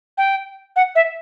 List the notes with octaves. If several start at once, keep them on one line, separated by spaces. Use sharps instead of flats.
G5
F#5
E5